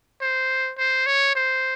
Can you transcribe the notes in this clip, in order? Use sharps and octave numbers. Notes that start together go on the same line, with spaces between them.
C5
C5
C#5
C5